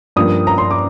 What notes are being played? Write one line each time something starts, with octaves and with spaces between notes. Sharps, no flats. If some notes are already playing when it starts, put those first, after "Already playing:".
G2 F3 A#3 D#6
A#5
C6
D6